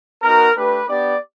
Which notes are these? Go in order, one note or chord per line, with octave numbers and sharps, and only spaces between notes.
B3 D#4 F#4 A#4
A3 D4 G4 B4
B3 D4 G4 D5